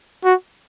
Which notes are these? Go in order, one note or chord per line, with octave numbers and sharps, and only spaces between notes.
F#4